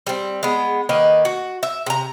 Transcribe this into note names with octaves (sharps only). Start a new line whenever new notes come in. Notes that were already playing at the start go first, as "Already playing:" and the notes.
G3 C4
G#3 B3
D#3 A#3 B4 D#5
F#4
E5
C3 A#5